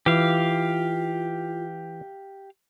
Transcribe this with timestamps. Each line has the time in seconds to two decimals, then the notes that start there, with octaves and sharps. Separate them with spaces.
0.06 E3 F4 G4 F5